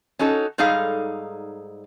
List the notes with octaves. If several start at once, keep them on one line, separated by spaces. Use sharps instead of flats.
C#4 D#4 F#4 A4
G#2 G3 D#4 G#4 A4 F5